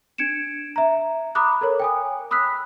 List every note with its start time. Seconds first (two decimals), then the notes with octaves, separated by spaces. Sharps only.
0.18 D4 G#6 C#7 D7 E7
0.76 E5 A#5
1.35 A#5 B5 D6 D#6 F#6
1.61 A4 A#4 C#5
1.80 G5 G#5 D#6
2.31 B5 D#6 E6 F#6 B6